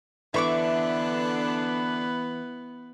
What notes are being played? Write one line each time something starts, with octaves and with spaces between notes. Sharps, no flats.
D3 E3 B3 D4 B4 E5 C#6 D6